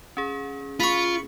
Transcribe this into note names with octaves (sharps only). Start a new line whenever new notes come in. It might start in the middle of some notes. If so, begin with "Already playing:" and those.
C#4 G#4
F4 B5 C#6